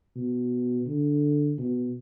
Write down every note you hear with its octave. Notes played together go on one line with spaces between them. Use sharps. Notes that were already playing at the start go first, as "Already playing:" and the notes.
B2
D3
B2